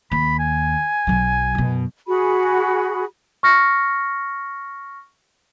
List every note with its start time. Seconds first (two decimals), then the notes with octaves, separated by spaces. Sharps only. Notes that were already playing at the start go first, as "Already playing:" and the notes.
0.12 D#2 B5
0.39 G#5
1.07 B1 F#3
1.55 F#2 B2
2.07 F#4 G#4 B5
3.43 C#6 F6 A#6 C#7